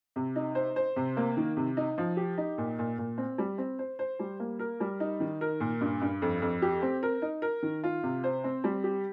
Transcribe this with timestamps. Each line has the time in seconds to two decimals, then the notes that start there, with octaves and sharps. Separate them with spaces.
0.16 C3
0.36 D#4
0.55 C5
0.76 C5
0.96 C3
1.17 A#3
1.37 D#3
1.57 C3
1.77 D#4
1.98 F3
2.17 G4
2.38 D#4
2.58 A#2
2.79 A#2
2.98 A#2
3.18 C4
3.38 G3
3.58 C4
3.79 C5
3.99 C5
4.19 G3
4.40 A#3
4.59 A#4
4.80 G3
5.00 D#4
5.20 D#3
5.41 A#4
5.60 A#2
5.81 G2
6.01 G2
6.22 F2
6.42 F2
6.62 G4
6.82 C4
7.03 A#4
7.22 D#4
7.42 A#4
7.63 D#3
7.84 F4
8.03 C3
8.24 C5
8.44 C4
8.64 G3
8.84 G4